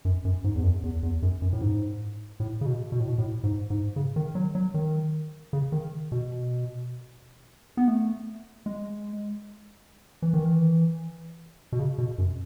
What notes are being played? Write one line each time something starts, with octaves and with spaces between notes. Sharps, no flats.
F#2
F#2
G#2
E2
F#2
E2
E2
F#2
F#2
A2
G#2
A2
C#3
B2
B2
A2
B2
A2
G#2
G#2
C#3
D#3
F#3
F#3
D#3
C#3
D#3
B2
B3
A3
G#3
E3
D#3
E3
B2
C#3
B2
F#2